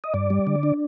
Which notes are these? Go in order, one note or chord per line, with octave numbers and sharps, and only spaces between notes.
D#5
G2 D5
G3
D3
D4